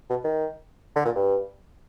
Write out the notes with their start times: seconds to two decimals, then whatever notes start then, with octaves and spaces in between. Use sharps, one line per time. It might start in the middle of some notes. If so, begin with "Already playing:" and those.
0.10 B2
0.24 D#3
0.96 D3
1.05 A#2
1.16 G2